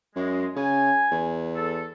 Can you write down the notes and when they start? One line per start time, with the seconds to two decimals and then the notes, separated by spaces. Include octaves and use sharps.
0.16 F#2 G#3
0.56 C#3 G#5
1.11 E2
1.56 A4